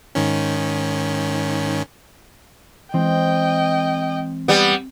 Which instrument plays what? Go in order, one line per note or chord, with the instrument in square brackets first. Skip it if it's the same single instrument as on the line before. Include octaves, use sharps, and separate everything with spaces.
[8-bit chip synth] G#2 D#3 C#4
[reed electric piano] E3 G#3 [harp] C4 [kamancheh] D#5 G5
[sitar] G3 B3